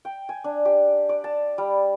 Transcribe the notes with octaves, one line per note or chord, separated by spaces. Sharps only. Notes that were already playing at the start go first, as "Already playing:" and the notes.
G5
G#5
D4
G4
D5
A5
G3